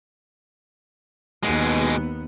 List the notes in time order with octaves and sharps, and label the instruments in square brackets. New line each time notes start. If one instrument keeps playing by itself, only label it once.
[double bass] D#2 B3 [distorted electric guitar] B2 G#3